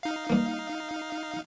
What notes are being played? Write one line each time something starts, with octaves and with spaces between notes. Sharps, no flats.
D#4 F5
G2 A#3